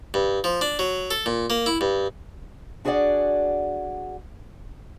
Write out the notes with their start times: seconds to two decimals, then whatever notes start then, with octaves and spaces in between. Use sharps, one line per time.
0.14 G2
0.44 F3
0.61 D4
0.79 F#3
1.11 A4
1.26 A#2
1.50 A#3
1.66 E4
1.81 G2
2.85 D4 F#4 G#4 B4 D5 F#5